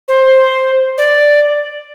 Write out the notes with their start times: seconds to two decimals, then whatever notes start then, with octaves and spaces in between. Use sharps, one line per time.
0.08 C5
0.98 D5